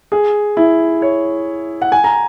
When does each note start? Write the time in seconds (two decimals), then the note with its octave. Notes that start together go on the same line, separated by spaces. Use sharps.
0.12 G#4
0.57 E4
1.02 C#5
1.82 F#5
1.92 G#5
2.04 A#5